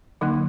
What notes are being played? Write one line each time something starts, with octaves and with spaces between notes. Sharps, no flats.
D3 F#3 A#3 D#4